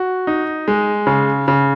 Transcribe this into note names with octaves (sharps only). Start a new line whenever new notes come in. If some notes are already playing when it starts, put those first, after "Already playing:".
Already playing: F#4
D#4
G#3
C#3
C#3